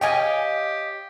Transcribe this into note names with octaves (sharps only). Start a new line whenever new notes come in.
G4 C#5 D#5 F5 G5 G#5